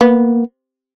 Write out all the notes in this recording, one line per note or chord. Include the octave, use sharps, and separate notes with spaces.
A#3 B3